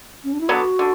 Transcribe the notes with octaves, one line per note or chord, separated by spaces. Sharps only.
C#4
D4
E4
D3 F#3 B3 D4 F#4
D3